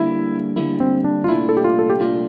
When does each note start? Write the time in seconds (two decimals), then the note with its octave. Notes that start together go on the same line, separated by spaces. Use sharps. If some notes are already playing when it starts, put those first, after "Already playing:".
Already playing: D3 G3 A#3 E4
0.56 D3 G3 A#3 E4
0.80 C4
1.04 D4
1.24 F4
1.28 C2 A#2 A3 D4 E4
1.49 A4
1.57 G4
1.64 F4
1.79 A4
1.90 G4
2.00 C2 A#2 A3 D4 F4